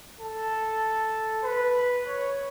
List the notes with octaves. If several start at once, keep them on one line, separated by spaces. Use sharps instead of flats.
A4
B4
C#5